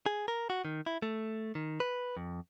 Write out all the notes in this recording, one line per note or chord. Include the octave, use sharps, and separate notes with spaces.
G#4
A#4
F#4
D#3
E4
A3
D#3
B4
F2